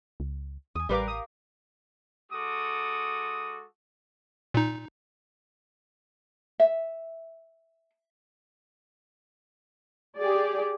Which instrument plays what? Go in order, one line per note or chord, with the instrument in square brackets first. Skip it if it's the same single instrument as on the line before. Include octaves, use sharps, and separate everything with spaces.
[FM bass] C#2
[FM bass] E2 [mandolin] G#5 D#6
[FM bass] A1 [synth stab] G3 B4 D6 [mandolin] G4 A#4 F5
[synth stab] D#6
[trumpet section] G#3 F#4 A4 D6 D#6
[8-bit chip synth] A#2 D#4
[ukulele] E5
[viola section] G4 G#4 D5